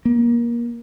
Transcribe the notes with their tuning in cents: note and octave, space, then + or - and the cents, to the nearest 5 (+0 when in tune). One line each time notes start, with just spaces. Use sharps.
A#3 +25